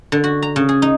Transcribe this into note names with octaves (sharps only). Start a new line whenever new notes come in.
D3
F#4
A#5
C#3
G#4
D#4